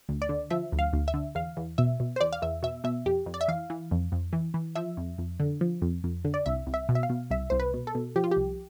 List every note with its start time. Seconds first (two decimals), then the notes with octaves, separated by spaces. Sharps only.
0.09 D2
0.22 D5
0.29 D3
0.50 F3 E5
0.72 D2
0.79 F5
0.93 D2
1.08 E5
1.14 D3
1.35 E2 F5
1.57 E2
1.78 B2 E5
2.00 B2
2.16 C5
2.21 E2 D5
2.33 F5
2.42 E2 E5
2.63 B2 E5
2.84 B2 E5
3.06 F2 G4
3.26 F2
3.34 D5
3.41 E5
3.48 E3 F5
3.70 E3
3.91 F2
4.12 F2
4.33 E3
4.54 E3
4.75 F3 E5
4.97 F2
5.18 F2
5.40 D3
5.61 F3
5.82 F2
6.04 F2
6.25 D3
6.34 D5
6.46 C2 E5
6.67 C2
6.74 E5
6.89 B2
6.95 E5
7.03 F5
7.10 B2
7.30 C2 E5
7.50 C2 C5
7.60 B4
7.74 B2
7.87 A4
7.95 B2
8.16 F3 G4
8.24 F4
8.31 G4
8.37 C2